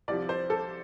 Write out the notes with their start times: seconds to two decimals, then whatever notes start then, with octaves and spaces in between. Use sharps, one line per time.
0.08 C2 C3 F3 D5
0.29 C5
0.50 A4